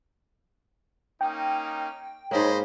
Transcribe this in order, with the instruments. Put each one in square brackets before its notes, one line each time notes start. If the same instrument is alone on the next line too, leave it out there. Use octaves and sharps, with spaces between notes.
[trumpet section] A#3 C#4 D#4 [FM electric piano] G5
[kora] G#2 A#3 [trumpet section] C5 D#5 B5 [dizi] C#5